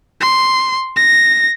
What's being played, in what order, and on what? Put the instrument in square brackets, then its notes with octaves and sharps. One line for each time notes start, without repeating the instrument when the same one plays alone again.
[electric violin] C6
A#6